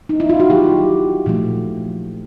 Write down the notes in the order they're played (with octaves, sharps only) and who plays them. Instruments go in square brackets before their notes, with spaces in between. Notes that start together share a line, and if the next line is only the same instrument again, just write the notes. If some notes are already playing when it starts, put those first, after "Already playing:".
[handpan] D#4
E4
F4
F#4
D#3 F#3 A#3 G4
A#2 F3 A3